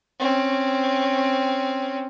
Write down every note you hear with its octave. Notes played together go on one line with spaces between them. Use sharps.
C4 C#4